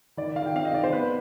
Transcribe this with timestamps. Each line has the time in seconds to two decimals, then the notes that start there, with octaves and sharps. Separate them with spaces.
0.17 D#3 D5
0.36 D#3 F5
0.46 G5
0.55 C4 F5
0.65 D#5
0.73 D#3 D5
0.84 C5
0.92 B3 B4